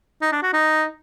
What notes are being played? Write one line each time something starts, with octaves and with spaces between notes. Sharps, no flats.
D#4
D4
F#4
D#4